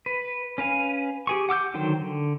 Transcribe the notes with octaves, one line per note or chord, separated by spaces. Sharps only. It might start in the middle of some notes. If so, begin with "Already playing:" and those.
B4
C#4 B4 F5 G#5
G4 G#4 C#6
F#5 D6 E6 G6
D3 D#3 F#3 C5 G5
D3